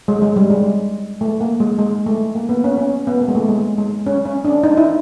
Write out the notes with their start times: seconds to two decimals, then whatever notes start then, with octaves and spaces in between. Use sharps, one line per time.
0.08 G#3
0.22 G#3
0.36 G3
0.50 G#3
1.21 A3
1.41 A#3
1.60 G#3
1.79 G#3
2.06 A3
2.35 A#3
2.49 B3
2.64 C#4
2.78 C#4
3.07 B3
3.21 A#3
3.28 G#3
3.35 A3
3.49 G#3
3.78 G#3
4.06 C#4
4.25 C#4
4.45 D4
4.63 D#4
4.77 E4